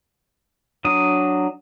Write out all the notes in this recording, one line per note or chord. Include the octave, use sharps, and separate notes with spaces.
F#3 D4 D#6